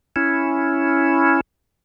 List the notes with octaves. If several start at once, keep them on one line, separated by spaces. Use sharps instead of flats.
C#4 E4